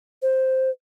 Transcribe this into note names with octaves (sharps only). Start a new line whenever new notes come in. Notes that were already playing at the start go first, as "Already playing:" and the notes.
C5